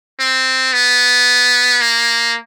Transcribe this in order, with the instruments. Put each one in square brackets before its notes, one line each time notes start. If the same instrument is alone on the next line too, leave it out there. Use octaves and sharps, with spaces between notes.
[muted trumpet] C4
B3
A#3